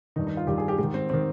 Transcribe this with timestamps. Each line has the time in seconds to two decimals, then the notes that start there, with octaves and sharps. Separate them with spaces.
0.16 G2 D#3 D#4
0.27 D#4
0.37 F4
0.47 G2 D#3 G4
0.58 G#4
0.68 G4
0.78 G#2 D#3 G4
0.94 C4
1.10 D#3 C4